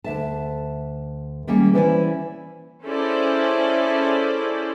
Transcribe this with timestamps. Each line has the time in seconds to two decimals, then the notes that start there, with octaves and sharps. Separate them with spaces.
0.04 D2 E5 A5
1.47 D#3 G3 G#3 A#3 C#4
1.74 E3 C#4 E4 C5 D5 G#5
2.84 C#4 E4 G#4 A4 C5 D5